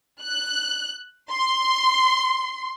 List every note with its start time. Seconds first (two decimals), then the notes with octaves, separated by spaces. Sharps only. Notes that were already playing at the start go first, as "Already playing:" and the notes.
0.21 F#6
1.31 C6